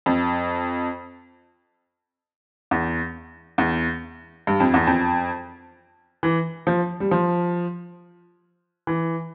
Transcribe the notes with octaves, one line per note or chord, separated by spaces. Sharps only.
F2
E2
E2
G2
F2
E2
F2
E3
F3
G3
F3
E3